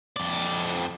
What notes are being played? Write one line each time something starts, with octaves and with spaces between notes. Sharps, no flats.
F2 D5